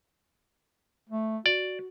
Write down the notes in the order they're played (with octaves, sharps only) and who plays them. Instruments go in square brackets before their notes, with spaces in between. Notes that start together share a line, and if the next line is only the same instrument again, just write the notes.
[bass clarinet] A3
[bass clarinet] F#4 [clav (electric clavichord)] D5